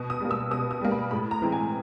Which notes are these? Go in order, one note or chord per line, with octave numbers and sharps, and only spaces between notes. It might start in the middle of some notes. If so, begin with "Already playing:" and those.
Already playing: B2
D#6
G3 A#3
E6
B2 D#6
D#6
G3 A#3
B5
A2 B5
A#5
E3 G#3 C4
G#5